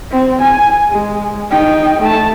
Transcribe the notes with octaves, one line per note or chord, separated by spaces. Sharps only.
C4
G#5
G#3
D#4 G5
A3 A5